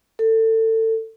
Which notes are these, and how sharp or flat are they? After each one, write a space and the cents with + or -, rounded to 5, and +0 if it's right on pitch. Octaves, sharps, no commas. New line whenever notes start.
A4 +25